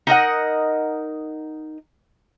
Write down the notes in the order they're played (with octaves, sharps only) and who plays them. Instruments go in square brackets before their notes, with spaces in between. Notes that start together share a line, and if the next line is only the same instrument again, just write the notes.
[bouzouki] D#4 A#4 D#5 F#5